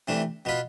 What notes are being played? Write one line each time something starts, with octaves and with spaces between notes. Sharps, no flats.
C3 E3 A3 D4
B2 B3 F4 B4